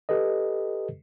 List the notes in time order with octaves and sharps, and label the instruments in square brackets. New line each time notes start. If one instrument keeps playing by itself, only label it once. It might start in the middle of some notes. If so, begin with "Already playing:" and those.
[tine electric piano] G4 A4 B4 D#5